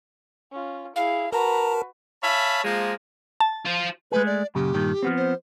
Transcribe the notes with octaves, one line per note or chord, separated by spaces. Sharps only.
C#4 F4
E4 G#4 F5
F#4 A#4 B4 A5 A#5
C#5 E5 F5 G#5 A5 B5
F3 G#3 A#3
A5
F4 C5
G#3 A3 G#4 B4
D5
F#2 A#2 C#3 G4
G2 A#2 D#3
F3 B3 C4
C5